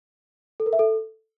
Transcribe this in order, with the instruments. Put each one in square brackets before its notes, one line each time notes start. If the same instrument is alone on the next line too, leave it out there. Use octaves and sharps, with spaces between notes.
[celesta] A4
A#4
E5
A4